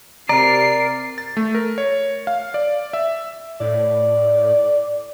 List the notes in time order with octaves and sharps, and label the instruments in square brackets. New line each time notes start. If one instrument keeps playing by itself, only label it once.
[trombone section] C3 [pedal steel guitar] A#4 D5 [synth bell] A#5 [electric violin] C7
[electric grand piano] A6
A3
A#4
C#5
F5
D5
E5
[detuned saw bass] A2 [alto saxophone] D5